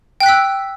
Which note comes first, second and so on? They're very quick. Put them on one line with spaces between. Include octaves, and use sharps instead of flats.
G5 F#6 B6 E6